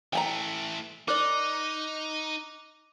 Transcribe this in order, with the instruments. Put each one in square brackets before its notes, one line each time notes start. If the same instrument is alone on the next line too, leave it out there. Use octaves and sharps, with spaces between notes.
[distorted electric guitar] E3 A3 [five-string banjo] G5 G#5 A#5
[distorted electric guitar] D#4 [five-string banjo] A#4 D5 [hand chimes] D6 F#6